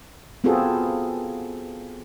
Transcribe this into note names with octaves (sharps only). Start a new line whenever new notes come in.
B3 C4 F4 F#4 G#4 A4